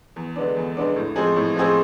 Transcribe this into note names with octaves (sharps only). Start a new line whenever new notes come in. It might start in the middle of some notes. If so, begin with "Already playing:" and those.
E2
D3 G#3 B3 D4
E2
D3 G#3 B3 D4
A2
F3 G#3 C4 G#4
A2
F3 G#3 C4 G#4